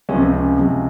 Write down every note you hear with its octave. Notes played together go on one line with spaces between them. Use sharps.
C#2 C3 F3 C#4
C4
C#4
C#2 C3 F3